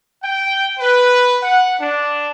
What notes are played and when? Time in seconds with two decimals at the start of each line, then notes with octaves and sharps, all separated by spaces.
0.23 G5
0.79 B4
1.42 F#5
1.79 D4